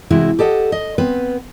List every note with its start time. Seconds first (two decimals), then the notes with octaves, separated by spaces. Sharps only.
0.10 C3 E3 G#3 E4 F#4
0.39 G4 A4 D#5 F#5
0.72 D#5
0.98 B3 C4 B4